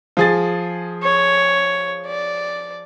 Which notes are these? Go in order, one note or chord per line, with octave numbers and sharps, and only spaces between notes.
F3 G#4 A6
C#5
D5